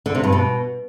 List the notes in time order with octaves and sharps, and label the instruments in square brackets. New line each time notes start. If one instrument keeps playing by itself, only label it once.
[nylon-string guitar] D3
C3
G2
B2